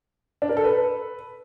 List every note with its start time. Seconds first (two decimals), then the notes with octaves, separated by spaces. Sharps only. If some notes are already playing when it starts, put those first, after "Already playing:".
0.42 D4
0.49 A#4
0.57 A4
0.64 B4